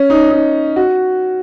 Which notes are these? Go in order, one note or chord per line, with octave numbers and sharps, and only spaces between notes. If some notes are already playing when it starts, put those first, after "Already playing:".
Already playing: C#4
D#4
D#4
F#4